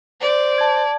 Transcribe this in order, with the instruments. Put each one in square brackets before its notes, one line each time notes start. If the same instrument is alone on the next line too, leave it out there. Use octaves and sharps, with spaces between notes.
[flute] C5 [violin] D5
[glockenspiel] A5 G#6